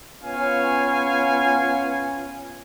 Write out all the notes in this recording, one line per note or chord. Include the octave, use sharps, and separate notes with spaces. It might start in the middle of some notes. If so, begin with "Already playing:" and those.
B3 C#4 F4 C#5 F5 G#5